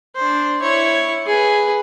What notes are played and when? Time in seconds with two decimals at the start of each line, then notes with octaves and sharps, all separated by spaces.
0.16 D4 C5
0.62 E4 C#5
1.27 G#4 B4